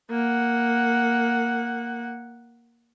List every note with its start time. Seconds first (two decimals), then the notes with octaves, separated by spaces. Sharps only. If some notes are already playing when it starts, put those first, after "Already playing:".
0.10 A#3 F#5